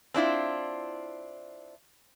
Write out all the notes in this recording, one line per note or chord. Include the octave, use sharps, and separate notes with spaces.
C4 D4 E4 F4